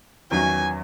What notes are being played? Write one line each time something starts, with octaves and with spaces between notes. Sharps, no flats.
E2 D#3 F#3 C#4 G#5